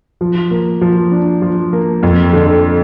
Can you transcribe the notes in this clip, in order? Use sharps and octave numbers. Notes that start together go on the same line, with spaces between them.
F3
A#3
F3
D4
F3
A#3
F2
D3